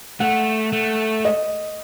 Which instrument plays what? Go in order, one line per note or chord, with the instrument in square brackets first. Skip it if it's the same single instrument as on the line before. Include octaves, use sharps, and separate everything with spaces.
[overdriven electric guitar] A3 [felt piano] F#5
[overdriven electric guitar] A3
[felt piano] D#5